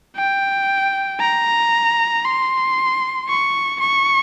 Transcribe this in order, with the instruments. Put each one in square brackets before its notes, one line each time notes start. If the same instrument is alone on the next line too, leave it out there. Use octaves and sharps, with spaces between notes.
[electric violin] G5
A#5
C6
C#6
C#6